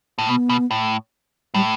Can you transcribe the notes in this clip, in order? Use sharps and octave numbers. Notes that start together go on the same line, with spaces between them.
A2
B2 B3
B2
A2
A2 G3